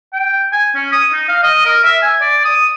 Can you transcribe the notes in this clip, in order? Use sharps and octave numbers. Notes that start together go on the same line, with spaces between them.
G5
G#5
C#4
D#6
D#4
F5
D#5
A#4
E5
G#5
D5
D#6